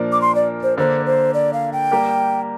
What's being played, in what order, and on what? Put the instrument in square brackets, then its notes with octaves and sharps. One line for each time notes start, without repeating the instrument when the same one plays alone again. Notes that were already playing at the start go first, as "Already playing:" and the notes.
Already playing: [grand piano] A#2 F3 D4 A#4
[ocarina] D6
C6
D5
C5
[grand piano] D3 A#3 D4 [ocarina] C5
[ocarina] C5
D5
F5
G5
[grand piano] G3 A#3 G4 A#4